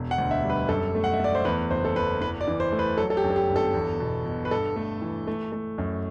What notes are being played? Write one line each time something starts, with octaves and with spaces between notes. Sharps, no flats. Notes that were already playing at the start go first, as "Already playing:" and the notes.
Already playing: E1
F#5
D2
E5
G3
B4
F#2 A4
A3
F#5
E5
A3 D5
C5
E2 B4
F#1 C5
A4
E2 B4
E3 B4
D5
E3
C5
A3
B4
F#3 A4
A4
G4
F#2
A4
G4
G1
A4
E2
B2
B2
B4
G2 A4
A3
E3
A3
A3
F#2